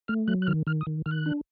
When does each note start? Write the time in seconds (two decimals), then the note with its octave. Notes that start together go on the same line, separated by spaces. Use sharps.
0.08 A3 F6
0.28 F#3 F#6
0.42 F#6
0.47 D#3 F6
0.67 D#3 F6
0.81 D#6
0.87 D#3
1.06 D#3 F6
1.11 F#6
1.26 D4